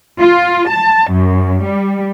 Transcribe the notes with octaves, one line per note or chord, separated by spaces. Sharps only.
F4
A5
F#2
G3